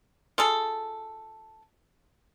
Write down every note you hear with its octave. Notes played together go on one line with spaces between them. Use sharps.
F4 G#4 A4